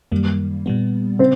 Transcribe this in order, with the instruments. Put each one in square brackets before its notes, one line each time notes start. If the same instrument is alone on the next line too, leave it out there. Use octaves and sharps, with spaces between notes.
[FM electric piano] F#2 D#3 G3 A#3
A#2 G3 B3
[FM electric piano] C#3 [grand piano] C4 C5